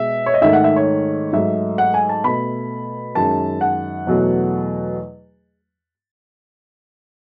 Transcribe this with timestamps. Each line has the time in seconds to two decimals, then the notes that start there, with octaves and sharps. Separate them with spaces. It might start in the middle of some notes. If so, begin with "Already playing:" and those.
Already playing: B2 G#3 E5
0.26 C#5
0.34 D#5
0.42 G#2 D#3 A3 E5
0.53 F#5
0.64 E5
0.76 C#5
1.33 G#2 F#3 A3 E5
1.78 F#5
1.94 G#5
2.09 A5
2.24 B2 A3 B5
3.15 F#2 D#3 G#3 A5
3.61 F#5
4.07 E2 B2 F#3 A3